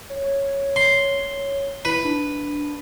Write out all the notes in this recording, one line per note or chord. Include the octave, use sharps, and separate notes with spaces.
C#5
C6
E4 B4
D4